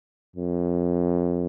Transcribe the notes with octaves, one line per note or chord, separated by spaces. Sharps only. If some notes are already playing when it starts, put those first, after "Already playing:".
F2